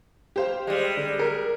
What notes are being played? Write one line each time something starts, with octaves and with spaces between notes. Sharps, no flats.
G4 C5 F5
G3 G#3
D3
A#4